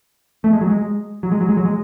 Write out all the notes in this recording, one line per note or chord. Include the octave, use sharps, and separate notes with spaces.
A3
G#3
F#3
G#3
F#3
G#3
F#3
G#3
F#3
G#3